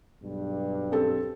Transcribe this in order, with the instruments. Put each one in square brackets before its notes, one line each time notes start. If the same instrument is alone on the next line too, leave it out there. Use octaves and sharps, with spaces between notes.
[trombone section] B1 G2 G3
[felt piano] C4 G4 A4